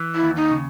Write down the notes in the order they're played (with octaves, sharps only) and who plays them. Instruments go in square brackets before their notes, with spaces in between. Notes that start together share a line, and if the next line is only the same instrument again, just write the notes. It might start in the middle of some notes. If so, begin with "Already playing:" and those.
Already playing: [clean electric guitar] E3
[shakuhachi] E4
[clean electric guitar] D#2
[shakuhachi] D#4
[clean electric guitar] C#3